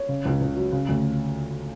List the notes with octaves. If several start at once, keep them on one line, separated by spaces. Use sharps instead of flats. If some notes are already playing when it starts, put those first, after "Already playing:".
Already playing: C#5
C#3
C#2
C#2
F#3
C#3
D2